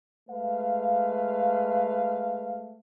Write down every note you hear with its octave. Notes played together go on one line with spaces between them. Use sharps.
G#3 A3 B4 F5